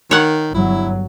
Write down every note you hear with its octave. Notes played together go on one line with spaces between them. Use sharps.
D#3 C#5 F#5
G1 F#3 E4